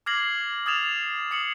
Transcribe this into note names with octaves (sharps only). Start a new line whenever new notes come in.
D6 F6 G#6 A#6 C7 F#7
D#6 F6 G#6 A6 E7 F7
D#6 C7 C#7 E7 F#7